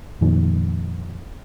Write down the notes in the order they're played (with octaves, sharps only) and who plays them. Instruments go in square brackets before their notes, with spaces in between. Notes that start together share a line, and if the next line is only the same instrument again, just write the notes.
[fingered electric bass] F2 A#2 D#3